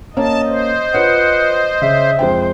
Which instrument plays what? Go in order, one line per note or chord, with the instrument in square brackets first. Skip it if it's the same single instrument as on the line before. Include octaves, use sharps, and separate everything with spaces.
[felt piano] A#3 C#4 [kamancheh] D#5 [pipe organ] A5
[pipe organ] C5
[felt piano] F4 B4 C#5 [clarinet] F#5
[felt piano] C#3 [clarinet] E5
[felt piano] F2 G#3 G5 [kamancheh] C5